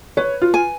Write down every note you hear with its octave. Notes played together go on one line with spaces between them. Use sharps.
B4 C#5
F4
G#5